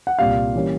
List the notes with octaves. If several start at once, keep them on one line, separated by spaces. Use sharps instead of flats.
F#5
C2 A#2 G3 F5
E3 G3 A#3 C#4